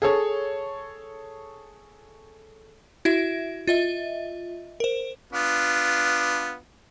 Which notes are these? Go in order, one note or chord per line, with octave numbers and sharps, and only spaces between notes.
G#4 A4 C#5
E4 F#4 E5
F4 D#5 E5
A#4 C5
B3 D4 F4